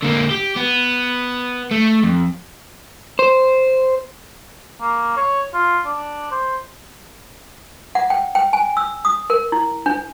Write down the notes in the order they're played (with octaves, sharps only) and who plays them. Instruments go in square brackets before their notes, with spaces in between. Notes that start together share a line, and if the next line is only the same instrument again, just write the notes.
[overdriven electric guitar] D3 A#3
G4
B3
A3
F2
[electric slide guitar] C5
[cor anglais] A#3
C#5
F4
D4
C5
[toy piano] F#5
G5
G5
G#5
E6
D#6
A#4
E4
D4